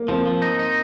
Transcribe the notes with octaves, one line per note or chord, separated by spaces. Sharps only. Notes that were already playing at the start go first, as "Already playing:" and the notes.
Already playing: A#3
F3 C4
F3
D#4
D#4